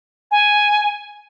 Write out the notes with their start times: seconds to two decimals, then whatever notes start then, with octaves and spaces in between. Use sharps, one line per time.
0.31 G#5